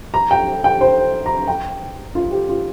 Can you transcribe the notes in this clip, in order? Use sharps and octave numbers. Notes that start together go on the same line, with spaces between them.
A#5
G5
G5
C5
A#5
G5
F4
G4
F4